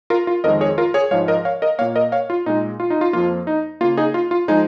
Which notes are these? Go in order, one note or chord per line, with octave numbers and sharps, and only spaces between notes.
F4 A#4
F4
F2 D#3 G#3 A#4 D#5
G#4 C#5
F4 A#4
G#4 C#5
G#2 F3 G#3 C#5 F5
A#4 D#5
C#5 F5
A#4 D#5
A#2 A#3 C#5 F5
A#4 D#5
C#5 F5
F4
A#2 G#3 D#4
F4
D#4
F4
F2 F3 A#3 F4
D#4
C#3 A#3 F4
D#4 G#4
F4
F4
F3 G#3 D#4 G#4